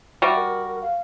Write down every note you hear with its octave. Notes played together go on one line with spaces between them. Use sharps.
G3 F#4 E5
A#4
F5